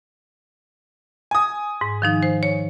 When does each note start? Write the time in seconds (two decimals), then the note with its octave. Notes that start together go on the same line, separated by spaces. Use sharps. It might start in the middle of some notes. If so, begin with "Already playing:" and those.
1.31 G#5 D#6
1.81 G#2
2.02 D#3 F3 D#4
2.23 C5
2.43 C#5